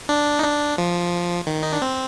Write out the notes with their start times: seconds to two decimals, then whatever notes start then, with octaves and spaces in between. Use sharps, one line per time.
0.09 D4
0.39 D#4
0.44 D4
0.78 F3
1.47 D#3
1.63 D#4
1.73 D4
1.82 C4